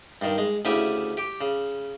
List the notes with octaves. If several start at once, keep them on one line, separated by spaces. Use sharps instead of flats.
G2 D#3
G#3
D2 C#3 E4 G4 G#5
G4 G5
C#3